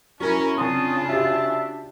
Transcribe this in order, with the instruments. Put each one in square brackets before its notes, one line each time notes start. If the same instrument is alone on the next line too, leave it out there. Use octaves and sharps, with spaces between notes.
[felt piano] F#3 [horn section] C#4 [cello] E4 A#4
[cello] C#3 F4 [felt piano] C4 C6 [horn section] D4 A5 [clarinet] D#6
[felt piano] F#4 G4 [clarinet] E5